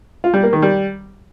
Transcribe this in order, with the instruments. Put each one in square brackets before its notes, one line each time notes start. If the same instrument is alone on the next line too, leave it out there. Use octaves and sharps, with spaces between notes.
[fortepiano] F4
G3
A#3
D#3
G3